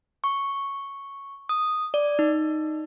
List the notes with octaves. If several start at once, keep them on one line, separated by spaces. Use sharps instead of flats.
C#6
D#6
D5
D#4